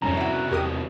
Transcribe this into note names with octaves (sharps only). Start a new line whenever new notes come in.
C2 F2 G#2 B2 C#4 A#5
E4 F#4
E2 G4 A#4 D#6